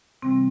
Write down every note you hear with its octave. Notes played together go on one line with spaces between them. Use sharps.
C3 E3 G3 C4